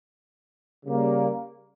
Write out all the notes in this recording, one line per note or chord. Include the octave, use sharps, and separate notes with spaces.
C#3 G3 A#3